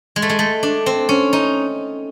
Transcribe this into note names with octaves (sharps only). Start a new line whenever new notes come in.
G#3
A3
G#3
A3
D4
C4
C#4
D#4